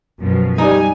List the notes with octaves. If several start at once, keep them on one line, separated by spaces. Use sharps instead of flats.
F#2 B2 F3
G3 D#4 G#5